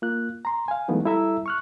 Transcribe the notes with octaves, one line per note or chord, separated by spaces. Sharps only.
A#3 F4 F#6
A#5 C6
F5 G#5
E3 F#3 G#3 A3 B3 D#4
G3 E4 A4 E5 A#5 E6
C#6 F6 F#6